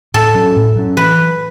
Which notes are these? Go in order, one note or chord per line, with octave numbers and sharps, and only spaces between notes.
A2 A4
F#3 C#4
A2
F#3 C#4
E3 B4